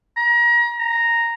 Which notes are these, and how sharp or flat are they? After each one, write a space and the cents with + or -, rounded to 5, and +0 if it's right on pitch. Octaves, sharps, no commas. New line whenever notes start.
A#5 +35
A#5 -5